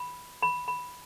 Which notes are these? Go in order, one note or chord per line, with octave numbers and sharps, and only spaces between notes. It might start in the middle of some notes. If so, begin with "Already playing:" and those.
Already playing: B5
B5
B5